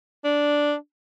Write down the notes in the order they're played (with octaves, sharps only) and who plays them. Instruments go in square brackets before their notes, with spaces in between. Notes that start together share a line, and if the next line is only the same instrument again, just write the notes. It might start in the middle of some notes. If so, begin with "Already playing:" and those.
[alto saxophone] D4